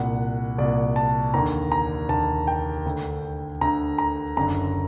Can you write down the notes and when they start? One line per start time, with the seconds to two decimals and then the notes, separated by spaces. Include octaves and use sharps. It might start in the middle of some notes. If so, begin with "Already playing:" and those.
Already playing: C2 A#2 F#5
0.58 C2 A#2 D5
0.96 A5
1.34 D#2 D3 A#5
1.72 A#5
2.09 D#2 D3 A5
2.47 G5
2.86 D2 D3
3.61 D2 D3 A#5
3.98 A#5
4.36 F#1 F#2 D3 A#5